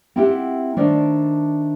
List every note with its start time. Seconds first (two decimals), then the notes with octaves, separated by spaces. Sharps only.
0.16 C4 E4 F4 G4 E5 F#5
0.76 D#3 A3 D4 A#4 C5 D5